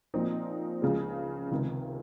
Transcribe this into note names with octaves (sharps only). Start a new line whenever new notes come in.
A#2 F3 C4 D#4
C#2 C#3 F3 G#3
C#2 C3 D#3